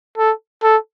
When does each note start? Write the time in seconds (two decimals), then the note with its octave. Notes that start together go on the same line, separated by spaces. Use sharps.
0.18 A4
0.63 A4